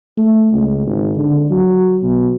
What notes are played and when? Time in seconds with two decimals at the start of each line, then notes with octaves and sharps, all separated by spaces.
0.18 A3
0.52 C#2
0.85 G#1
1.17 D3
1.51 F#3
2.03 B2